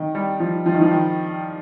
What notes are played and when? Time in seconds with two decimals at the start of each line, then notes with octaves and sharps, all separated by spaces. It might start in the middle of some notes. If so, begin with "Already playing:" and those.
Already playing: D#3
0.15 G3
0.40 F3
0.66 F3
0.74 D#3
0.81 F3
0.91 D#3